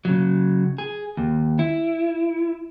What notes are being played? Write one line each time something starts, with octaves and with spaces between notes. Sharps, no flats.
C#3 F#3
G#4
D#2
E4